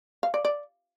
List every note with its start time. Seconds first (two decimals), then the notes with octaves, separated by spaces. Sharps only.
0.23 F5
0.34 D5
0.45 D5